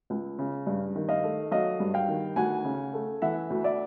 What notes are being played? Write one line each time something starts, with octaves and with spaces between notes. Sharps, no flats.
C#2
C#3
G2
D#3
D#5 F5
A3
F#3 D#5 F5
G2
F5 G5
D#3
D2 F#5 G#5
C#3
A3
E3 E5 F#5
D2
D5 E5